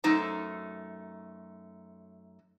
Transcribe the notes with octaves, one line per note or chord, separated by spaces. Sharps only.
F#2 A3 D#4 A4 C5 A#5